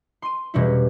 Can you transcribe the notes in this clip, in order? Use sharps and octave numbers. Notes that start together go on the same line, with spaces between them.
C6 D#7
E1 B2 G3 C#4 E4